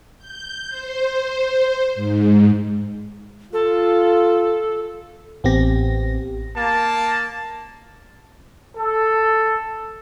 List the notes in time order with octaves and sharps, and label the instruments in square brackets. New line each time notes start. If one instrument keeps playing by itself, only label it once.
[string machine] G6
C5
G#2
[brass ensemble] F4 [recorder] A4
[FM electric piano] A1 B3 C4 G4 A#6
[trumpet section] A#3 A5
A4